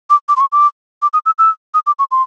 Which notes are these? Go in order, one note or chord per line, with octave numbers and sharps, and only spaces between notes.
D6
D6
C6
C#6
D6
D6
D#6
E6
E6
D#6
D6
C#6
C6